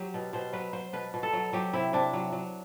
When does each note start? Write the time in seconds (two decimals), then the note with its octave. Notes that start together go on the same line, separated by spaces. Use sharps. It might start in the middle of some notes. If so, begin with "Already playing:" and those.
Already playing: F#3 G4
0.14 B2
0.33 B2 C5
0.53 F#3 B4
0.73 F#3 C5
0.93 B2 B4
1.14 B2
1.23 A4
1.33 F#3
1.53 F#3 G4
1.73 C3 E4
1.93 C3 D4
2.13 F#3
2.33 F#3